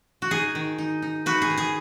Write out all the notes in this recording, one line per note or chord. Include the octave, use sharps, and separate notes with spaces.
F#4
D#4 G#4
D#3
D#4
D#4
D#4 F#4 B4
G#4
D#3
G#4